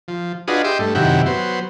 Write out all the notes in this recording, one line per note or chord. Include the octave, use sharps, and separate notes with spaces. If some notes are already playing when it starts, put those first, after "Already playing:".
F3
D4 F4 F#4 G#4 B4 D#5
G4 D#5 E5 C6 D6
G2 A3
F#2 C3 D#3 E4 G4 F#5
F#3 B3 C5